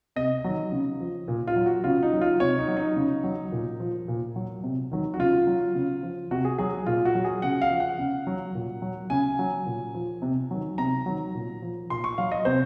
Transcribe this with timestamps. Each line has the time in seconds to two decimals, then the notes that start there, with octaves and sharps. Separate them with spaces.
0.16 C3 D#5
0.44 D#3 F#3
0.72 C#3
1.00 F3
1.28 A#2
1.47 F4
1.56 F#3
1.66 F#4
1.84 C#3 F4
2.03 D#4
2.13 F#3
2.21 F4
2.40 C3 C#5
2.59 D#4
2.68 F#3
2.77 D#4
2.96 C#3
3.24 F#3
3.52 A#2
3.80 F3
4.08 A#2
4.36 F#3
4.63 C3
4.91 D#3 F#3
5.14 F#4
5.19 C#3 F4
5.47 F#3
5.75 C#3
6.03 F3
6.31 C3 F#4
6.45 G#4
6.58 F#3 G#4
6.86 A#2 F4
7.05 F#4
7.15 F#3
7.25 G#4
7.42 C#3 F#5
7.62 F5
7.71 F3
7.80 F#5
7.99 C#3
8.27 F#3
8.55 A#2
8.82 F#3
9.10 C#3 G#5
9.39 F#3
9.66 A#2
9.94 F3
10.22 C3
10.51 D#3 F#3
10.78 C3 A#5
11.06 D#3 F#3
11.35 A#2
11.62 F3
11.90 A#2 C6
12.04 C#6
12.18 F#3 F5
12.32 D#5
12.45 C3 C5